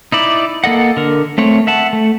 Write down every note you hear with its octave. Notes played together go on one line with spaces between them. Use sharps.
D#4 E4 D5
A#3 A4 D#5 F#5
D3 A#4
A3 C4 C#5
E5 F#5 A5
A3